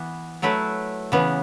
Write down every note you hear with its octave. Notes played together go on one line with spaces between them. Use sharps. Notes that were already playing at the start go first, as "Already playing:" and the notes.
Already playing: E3 B3
F#3 A3 E4 B4
C#3 E3 B3